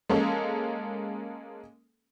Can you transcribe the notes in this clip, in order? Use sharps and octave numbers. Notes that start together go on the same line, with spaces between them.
G#3 A#3 C#4 A4